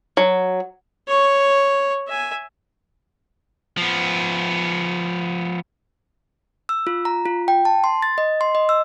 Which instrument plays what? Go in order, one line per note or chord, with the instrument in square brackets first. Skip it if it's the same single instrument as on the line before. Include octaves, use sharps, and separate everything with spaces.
[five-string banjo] F#3
[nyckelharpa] C#5 C#6
E5 G#5
[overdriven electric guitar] F3 B3
[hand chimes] E6
F4
A#5
F4
G5
A5
C6
A6
D#5
C6
D#5
E6